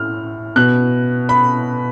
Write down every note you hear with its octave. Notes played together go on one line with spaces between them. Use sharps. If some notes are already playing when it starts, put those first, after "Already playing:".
Already playing: A2 F6
B2 F#6
B5